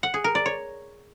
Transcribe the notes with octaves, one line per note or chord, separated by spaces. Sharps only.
F#5
G#4
A#4
D5
C#5